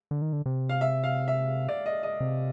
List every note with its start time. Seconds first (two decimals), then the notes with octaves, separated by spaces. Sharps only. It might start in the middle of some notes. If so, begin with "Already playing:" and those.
0.11 D3
0.22 D#3
0.33 D3
0.46 C3
0.69 F5
0.81 E5
1.04 F5
1.28 E5
1.69 D5
1.86 D#5
2.03 D#5
2.20 C3